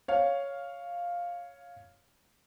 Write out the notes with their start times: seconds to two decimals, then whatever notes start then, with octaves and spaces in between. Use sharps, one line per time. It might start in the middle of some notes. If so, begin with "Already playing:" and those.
0.08 C#5 F5